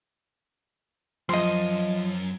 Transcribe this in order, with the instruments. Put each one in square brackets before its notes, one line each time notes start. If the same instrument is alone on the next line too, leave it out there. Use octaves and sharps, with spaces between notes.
[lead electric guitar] F#2 [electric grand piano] F3 [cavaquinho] D#5 C6